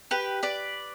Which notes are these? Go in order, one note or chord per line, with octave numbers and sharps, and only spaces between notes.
G4 B4
B4 D5